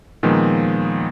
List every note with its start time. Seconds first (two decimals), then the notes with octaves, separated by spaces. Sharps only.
0.23 A#2 D#3 F3 G#3 B3